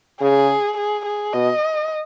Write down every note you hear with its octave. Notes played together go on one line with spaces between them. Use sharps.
C#3 G#4
G#4
G#4
B2 D#5